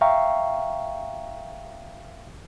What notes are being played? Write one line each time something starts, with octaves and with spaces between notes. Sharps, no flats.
E5 F5 G5 A#5 C#6